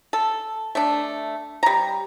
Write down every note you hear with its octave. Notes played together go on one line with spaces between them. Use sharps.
A4
A3 D4
G3 A#5